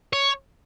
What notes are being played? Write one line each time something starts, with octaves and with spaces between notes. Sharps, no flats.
C#5